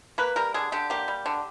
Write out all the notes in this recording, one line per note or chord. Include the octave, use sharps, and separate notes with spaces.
A#3 B4
G3 A#4
D3 G#4
D3 G4
A#3 G4
G3
D3